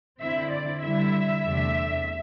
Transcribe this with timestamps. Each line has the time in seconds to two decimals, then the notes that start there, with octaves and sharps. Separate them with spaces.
0.21 D3 C4 E4 E5
0.53 D5
0.82 D3 G3 E4 E5
1.44 E2 C3 A3 D4